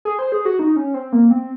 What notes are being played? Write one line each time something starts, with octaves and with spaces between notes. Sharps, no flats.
G#4
C5
G#4
F#4
D#4
C#4
C4
A#3
C4